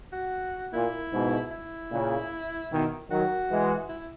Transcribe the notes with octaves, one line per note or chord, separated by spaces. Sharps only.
F#4
A#2 E4
G#2 B2
E4
A#2 C#3
B2 D#3
D#3 F#3 F#4
E3 G#3
E4